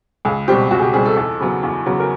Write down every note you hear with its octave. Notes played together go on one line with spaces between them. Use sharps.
C#2 G#4
B2 G3 C4 G4
C#2 F#4
G#4
G4
B2 G3 C4 G#4
A4
E2 A4
C#3 F#3 B3
E2
C#3 F#3 B3
A#4